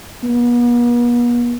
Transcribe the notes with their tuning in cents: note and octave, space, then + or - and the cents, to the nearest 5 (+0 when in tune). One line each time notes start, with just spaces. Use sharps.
B3 -45